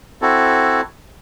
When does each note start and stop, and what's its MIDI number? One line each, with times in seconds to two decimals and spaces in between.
0.22 0.81 60
0.22 0.81 64
0.22 0.81 66
0.22 0.81 69